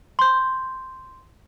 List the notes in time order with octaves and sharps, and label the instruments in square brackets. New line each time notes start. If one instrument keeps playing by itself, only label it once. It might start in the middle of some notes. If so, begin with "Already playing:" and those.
[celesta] C6 G6